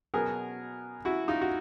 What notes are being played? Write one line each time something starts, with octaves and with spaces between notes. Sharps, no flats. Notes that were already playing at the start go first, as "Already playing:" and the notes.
B2 F#3 B3 G#4 A#4
E4 F#4
D#4 F4
F#4